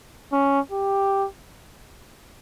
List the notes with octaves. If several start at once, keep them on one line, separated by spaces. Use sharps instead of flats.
C#4
G4